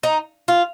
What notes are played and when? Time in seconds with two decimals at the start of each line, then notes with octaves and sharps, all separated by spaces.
0.03 D#4
0.48 F4